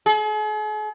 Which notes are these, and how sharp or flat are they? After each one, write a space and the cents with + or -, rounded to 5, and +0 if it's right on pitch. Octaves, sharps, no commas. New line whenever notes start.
G#4 +45